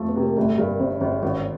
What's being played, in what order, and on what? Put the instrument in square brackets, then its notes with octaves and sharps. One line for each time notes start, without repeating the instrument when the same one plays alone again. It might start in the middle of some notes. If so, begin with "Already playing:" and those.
Already playing: [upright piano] F2 F3 A3
[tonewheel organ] B3
[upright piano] C3
[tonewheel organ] A#3
[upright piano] G1 [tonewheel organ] A3
[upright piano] G2 [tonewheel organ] A#3
[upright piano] G1 [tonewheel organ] C4
[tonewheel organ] C#4
[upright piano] G1 [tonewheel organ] C4
[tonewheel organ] C#4
[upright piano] G#1 [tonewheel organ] C#4